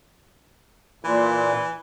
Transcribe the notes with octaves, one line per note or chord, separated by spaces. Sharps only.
A#2 E3